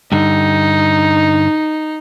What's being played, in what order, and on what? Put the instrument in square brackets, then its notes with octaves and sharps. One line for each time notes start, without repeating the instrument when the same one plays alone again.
[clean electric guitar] G2 D3 [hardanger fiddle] D#4